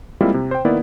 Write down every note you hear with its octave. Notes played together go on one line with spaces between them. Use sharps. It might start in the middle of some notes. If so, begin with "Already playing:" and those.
G3 G#3 A#3 C4 E4 F4
C3
C5 G5
D#3 A#3 B3 E4 D5